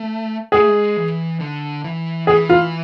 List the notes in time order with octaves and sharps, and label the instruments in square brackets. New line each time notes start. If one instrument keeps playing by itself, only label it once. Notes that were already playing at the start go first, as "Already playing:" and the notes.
Already playing: [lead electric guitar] A3
[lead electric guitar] G#3 [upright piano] G#4
[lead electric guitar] A3
G#3
E3
D3
E3
[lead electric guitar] E3 [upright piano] G#4
[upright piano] F4